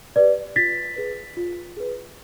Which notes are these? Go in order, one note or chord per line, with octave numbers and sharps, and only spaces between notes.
G4 B4 D5
F4 A6 B6
G#4 B4
F4
G#4 B4